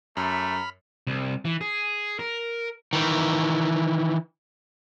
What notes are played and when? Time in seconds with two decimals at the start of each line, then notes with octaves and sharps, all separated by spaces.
0.17 F#2 A3 A#5 B5 F6
1.07 C2
1.45 E3
1.61 G#4
2.19 A#4
2.93 D#3 E3